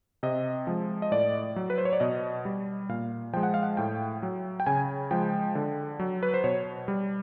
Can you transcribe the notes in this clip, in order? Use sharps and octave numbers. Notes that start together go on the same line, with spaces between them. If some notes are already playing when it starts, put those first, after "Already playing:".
C3 D#5
F3 G#3
D#5
A2 D5
F#3
B4
C5
C#5
D5
B2 D#5
G3
A#2 F5
F3 G#3 G5
F#5
F5
F#5
A2 G5
F#3
G5
C#3 G#5
F3 G#3 G5
D3
F#3
B4
C5
B2 C#5
G3